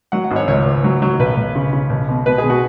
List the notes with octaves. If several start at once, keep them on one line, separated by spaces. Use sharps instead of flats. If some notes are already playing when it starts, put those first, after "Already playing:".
F#3 F#5
F#5
G#1
C#5
C#2 C#5
C#2
F#3
F#3
B1 B4
B1
C#3
C#3
B1
B2
B2 B4
G#4
B2
F#4